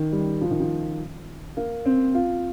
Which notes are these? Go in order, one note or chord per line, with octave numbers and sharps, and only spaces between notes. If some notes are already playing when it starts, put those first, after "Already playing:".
Already playing: D#3
G3
F3
D#3
F3
A#3
C4
F4